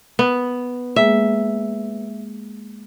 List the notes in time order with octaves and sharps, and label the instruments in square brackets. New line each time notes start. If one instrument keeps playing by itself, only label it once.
[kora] B3
[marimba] G#3 A#3 G#4 [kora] E5